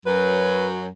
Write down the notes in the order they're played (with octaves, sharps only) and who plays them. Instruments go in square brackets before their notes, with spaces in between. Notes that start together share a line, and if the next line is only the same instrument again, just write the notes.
[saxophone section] F#2 F#3 [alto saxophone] B4